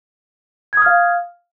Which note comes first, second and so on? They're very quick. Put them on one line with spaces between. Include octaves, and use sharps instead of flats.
G#6 D#6 F6 F5